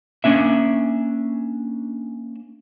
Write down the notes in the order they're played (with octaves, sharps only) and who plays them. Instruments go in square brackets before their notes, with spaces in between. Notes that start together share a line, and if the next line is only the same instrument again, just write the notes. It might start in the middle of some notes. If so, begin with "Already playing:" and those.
[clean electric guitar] A#3 C#4 D4 E5